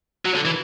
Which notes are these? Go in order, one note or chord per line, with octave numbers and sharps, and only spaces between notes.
F#3
D3
E3